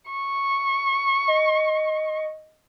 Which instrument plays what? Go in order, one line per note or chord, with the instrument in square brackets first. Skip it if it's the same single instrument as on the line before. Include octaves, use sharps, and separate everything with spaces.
[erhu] C#6
[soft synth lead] D#5